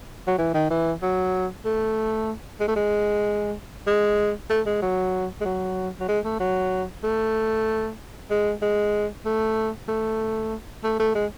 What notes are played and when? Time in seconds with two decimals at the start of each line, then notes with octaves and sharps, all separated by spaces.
0.28 F#3
0.38 E3
0.54 D#3
0.70 E3
1.02 F#3
1.65 A3
2.60 G#3
2.68 A3
2.76 G#3
3.87 G#3
4.50 A3
4.66 G#3
4.82 F#3
5.41 G#3
5.45 F#3
6.00 F#3
6.08 G#3
6.24 A3
6.40 F#3
7.04 A3
8.30 G#3
8.62 G#3
9.26 A3
9.88 A3
10.84 A3
11.00 A3
11.15 G#3